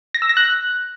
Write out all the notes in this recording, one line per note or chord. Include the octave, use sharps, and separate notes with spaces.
A#6
E6
A#6
F#6